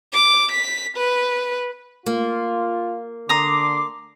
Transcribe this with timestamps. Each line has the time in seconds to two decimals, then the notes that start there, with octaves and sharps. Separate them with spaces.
0.13 D6
0.52 B6
0.97 B4
2.06 A#3 F4
3.29 D3 A#5 C6 D6 D#6